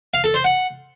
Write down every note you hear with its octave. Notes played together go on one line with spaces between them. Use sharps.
F5
A4
C5
F#5